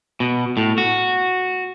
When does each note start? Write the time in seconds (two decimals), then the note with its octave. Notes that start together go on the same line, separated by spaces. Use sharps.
0.20 B2
0.57 A2
0.78 F#4